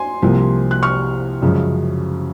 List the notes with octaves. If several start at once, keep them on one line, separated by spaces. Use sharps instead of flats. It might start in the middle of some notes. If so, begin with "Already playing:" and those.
Already playing: G#5 C6
C2 C3 F3 A#3
F#6
C#6 F6
F#2 C#3 F3 G#3